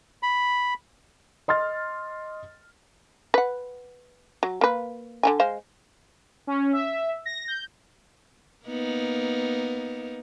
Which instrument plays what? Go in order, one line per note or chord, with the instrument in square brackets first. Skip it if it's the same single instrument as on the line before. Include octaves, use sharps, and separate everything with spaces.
[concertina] B5
[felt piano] D#5 C6 F6 A6
[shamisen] B4 F#5
F#3
A#3 B4
D3 E3 G#5
G#3 C5 F5
[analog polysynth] C#4
E5
A#6
G6
[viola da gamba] A#3 B3 D#4